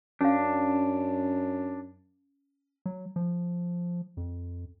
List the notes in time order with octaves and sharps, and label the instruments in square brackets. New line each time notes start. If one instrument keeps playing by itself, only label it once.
[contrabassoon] F#2 [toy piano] C#4 F5 [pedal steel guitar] D4
[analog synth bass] F#3
F3
F2